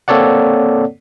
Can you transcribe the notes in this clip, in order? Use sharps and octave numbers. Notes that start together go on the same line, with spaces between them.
A#3 C4 A4 C#5 D5 F#5